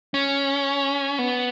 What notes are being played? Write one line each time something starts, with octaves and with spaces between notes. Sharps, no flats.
C#4
B3